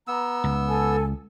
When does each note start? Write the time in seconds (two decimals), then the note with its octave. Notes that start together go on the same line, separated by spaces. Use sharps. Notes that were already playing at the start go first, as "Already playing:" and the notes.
0.08 B3 A#5 E6
0.44 C#2
0.68 A4 G#5